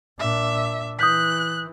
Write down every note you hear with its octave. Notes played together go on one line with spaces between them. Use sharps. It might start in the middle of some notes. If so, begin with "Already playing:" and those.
A#2 D4 E5
E3 D#6 F#6 G6 B6